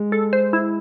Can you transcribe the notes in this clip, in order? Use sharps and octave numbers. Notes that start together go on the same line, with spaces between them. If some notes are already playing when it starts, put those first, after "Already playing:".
Already playing: G#3
A4
C5
E4